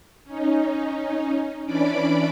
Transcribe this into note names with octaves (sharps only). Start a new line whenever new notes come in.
C#4 D#4
E3 C#4 D4 D5 B5 D6